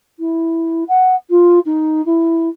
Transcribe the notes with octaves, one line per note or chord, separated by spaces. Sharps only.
E4
F#5
F4
D#4
E4